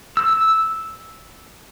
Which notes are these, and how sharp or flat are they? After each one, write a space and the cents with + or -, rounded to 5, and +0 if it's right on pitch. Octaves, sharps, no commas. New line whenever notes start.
E6 -5